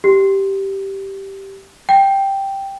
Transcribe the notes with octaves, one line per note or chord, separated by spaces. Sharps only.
G4
G5